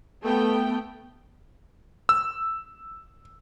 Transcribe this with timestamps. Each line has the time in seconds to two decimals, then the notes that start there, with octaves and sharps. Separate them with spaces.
0.24 A3 B3 G5
2.09 E6